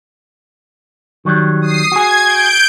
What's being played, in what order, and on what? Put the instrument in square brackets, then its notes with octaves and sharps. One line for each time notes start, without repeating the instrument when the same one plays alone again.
[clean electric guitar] D#3 F#3 G3
[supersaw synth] D#6 C7
[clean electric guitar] F#4 G#4 [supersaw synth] G#6
[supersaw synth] G6 D7